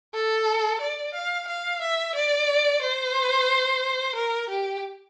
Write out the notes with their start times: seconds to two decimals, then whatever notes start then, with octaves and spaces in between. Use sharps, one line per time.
0.14 A4
0.81 D5
1.14 F5
1.48 F5
1.81 E5
2.15 D5
2.82 C5
4.16 A#4
4.49 G4